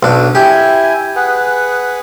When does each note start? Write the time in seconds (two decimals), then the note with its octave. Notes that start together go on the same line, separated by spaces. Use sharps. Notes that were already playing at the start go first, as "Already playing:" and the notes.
0.03 B1 D4
0.35 E4 G4 G#5
1.16 G#4 B4 F#5